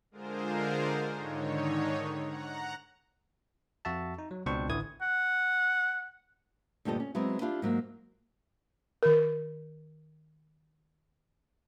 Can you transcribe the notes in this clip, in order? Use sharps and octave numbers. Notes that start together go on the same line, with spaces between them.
D3 G#3 F4 G#4 A#4 C5
G#2 D3 D#3 D#4 C#5
F#5 A#5
F2 F#4 E5 A5
D#4
F#3
C#2 B2 C4 D4 C5 C#6
A1 D3 E3 E4 D#6 G#6
F#5
D2 G2 A#2 G4 A4 D#5
C#4
F#3 G#3 B3 C4 E4
D4 E4 F4 G4 D5
G#2 F#3 A#3
D#3 A#4